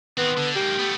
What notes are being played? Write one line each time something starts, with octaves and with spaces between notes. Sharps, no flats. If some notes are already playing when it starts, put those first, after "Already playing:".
D#3 B3 C4
D3
G#2 A#3 G4
A3 B3